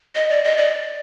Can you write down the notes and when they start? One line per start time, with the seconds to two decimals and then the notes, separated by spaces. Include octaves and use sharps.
0.15 D#5
0.30 D5
0.44 D#5
0.57 D5